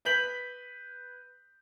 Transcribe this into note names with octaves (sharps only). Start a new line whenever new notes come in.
B4 G6 B6 F#7